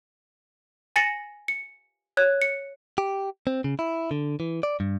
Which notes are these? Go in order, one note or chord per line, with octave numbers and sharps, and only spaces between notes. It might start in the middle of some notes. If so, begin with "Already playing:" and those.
G#5 A6 A#6 C#7 E7 F#7
C#7
C#5 F#6 G#6
C#7
G4
C4
C#3
E4
D3
E3
D5
G2